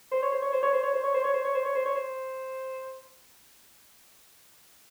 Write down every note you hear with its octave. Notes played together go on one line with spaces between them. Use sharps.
C5
C#5
C5
C#5
C5
C#5
C5
C#5
C5
C#5
C5
C#5
C5
C#5
C5
C#5
C5
C#5
C5